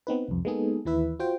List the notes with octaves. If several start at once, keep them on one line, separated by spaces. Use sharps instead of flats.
B3 C4 D#4 B4
C2 F2
G#3 A#3 B3 D#4 G#4 A4
D#2 E3 E4 B4 E5
F4 F#4 C5 G5